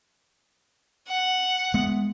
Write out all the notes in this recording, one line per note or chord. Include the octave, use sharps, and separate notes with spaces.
F#5
G#3 B3